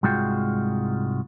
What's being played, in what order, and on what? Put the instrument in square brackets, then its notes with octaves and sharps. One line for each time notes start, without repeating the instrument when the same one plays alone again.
[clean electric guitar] C2 G#2 G#3 F4 F#4 G5